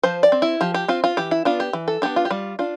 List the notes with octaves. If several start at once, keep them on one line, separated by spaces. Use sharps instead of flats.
F3 C5
D5
C4
E4
F3 G4
G4
C4 F4
F4
E3 G4
E4
B3 D4 F4
G4
E3
A4
B3 D4 G4
F4
G4
G3 F4
D4 F4